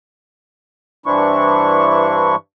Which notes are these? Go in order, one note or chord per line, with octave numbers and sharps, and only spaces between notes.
G2 E3 C4 D4 E4 C#6